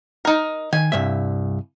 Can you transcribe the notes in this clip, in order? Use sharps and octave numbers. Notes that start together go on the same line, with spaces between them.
D#4 A#4
D#3 G#5
C2 G2 E5